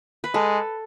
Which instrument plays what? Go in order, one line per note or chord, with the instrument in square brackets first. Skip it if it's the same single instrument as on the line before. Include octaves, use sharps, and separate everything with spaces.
[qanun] B4
[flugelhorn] G#3 [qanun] A4